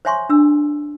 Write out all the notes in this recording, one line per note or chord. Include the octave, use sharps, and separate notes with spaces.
C5 C#5 E5 G#5 C6 C#6
D4 E6